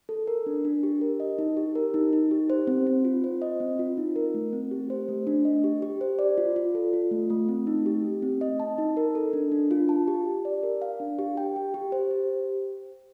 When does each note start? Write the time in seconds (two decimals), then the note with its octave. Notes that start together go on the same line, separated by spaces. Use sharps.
0.09 A4
0.27 A#4
0.46 D4
0.65 D4
0.83 G4
1.01 A#4
1.20 D#5
1.39 D#4
1.57 G4
1.75 A#4
1.94 D#4
2.13 D#4
2.31 G4
2.50 C5
2.67 C4
2.87 C4
3.05 F4
3.24 C5
3.42 D#5
3.60 C4
3.79 F4
3.97 D#4
4.16 A#4
4.34 A3
4.53 C4
4.71 G4
4.90 C5
5.08 A3
5.27 D4
5.45 D#5
5.64 G4
5.82 G4
6.01 C5
6.19 D5
6.38 F4
6.56 F4
6.75 A4
6.93 F4
7.11 A3
7.30 A3
7.49 C4
7.67 D#4
7.86 G4
8.04 A3
8.22 C4
8.41 D#5
8.60 A5
8.78 D#4
8.97 A#4
9.15 A4
9.33 D4
9.52 D4
9.71 F4
9.89 A5
10.08 G4
10.26 G4
10.45 D5
10.63 A#4
10.82 F5
11.00 D4
11.19 G4
11.37 G5
11.56 G4
11.74 G4
11.92 C5
12.11 G4